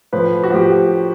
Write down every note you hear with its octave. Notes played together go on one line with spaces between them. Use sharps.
A2 F3 B4
F#4
A2 F3 G4